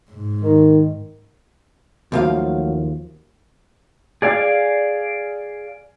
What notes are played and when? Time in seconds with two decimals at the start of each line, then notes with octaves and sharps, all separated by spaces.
0.11 G#2
0.43 D#3
2.12 D#2 F3 F#3 A3 F#4 F5
4.22 G#4 D5 F5 G#5